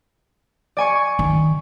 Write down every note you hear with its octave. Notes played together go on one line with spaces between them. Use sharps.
D5 G#5 C#6
D#3